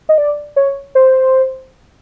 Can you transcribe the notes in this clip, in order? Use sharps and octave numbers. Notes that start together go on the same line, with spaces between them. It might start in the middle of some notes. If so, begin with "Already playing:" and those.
D#5
D5
C#5
C5